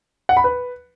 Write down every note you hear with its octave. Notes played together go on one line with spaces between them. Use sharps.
F#5
B5
B4